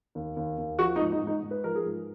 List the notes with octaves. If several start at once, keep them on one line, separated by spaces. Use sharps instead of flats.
D#2
D#2
D#2
F3 F#4
D#4
G#2
D#4
G#2
D#4
G#2
B4
F3 A#4
G#4
G#2